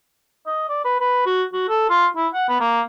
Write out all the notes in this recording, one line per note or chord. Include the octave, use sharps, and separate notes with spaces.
D#5
D5
B4
B4
F#4
F#4
A4
F4
E4
F#5
B3
A#3